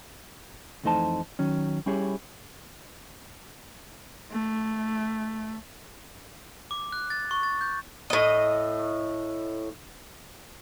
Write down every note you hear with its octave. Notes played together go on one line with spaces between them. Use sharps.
F2 E3 A3 D#4 C5 A5
D#3 F#3 C#4
G3 C#4 E4 G4 G#4 C#5
A3
D6
F#6
A6
C#6
A6
G6
A2 D#5